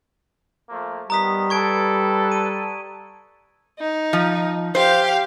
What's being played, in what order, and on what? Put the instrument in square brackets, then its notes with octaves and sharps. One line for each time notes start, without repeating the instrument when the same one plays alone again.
[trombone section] F3 A3 A#3
[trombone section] D#3 B3 [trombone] G3 [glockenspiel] A#5 D#6 B6
[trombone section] A4 B4 [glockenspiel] C#6 G#6 D7
[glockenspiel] D#7
[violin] D#4
[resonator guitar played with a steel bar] F3
[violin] G4 F5 [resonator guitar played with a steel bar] C5